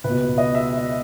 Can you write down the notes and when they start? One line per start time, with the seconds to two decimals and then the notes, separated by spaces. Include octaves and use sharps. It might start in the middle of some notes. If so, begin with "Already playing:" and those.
0.04 C#2 B2 B4
0.38 D#5
0.55 E5